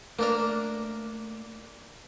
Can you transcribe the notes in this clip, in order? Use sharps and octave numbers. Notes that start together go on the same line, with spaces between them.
A3 A#3 D4 A#4